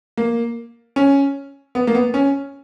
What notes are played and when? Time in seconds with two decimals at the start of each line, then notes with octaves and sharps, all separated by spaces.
0.17 A#3
0.96 C#4
1.75 B3
1.87 A#3
1.95 B3
2.14 C#4